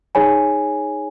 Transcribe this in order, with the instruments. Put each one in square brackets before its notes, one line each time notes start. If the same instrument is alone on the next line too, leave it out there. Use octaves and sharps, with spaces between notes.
[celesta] D#4 G#4 C#5 G#5 B5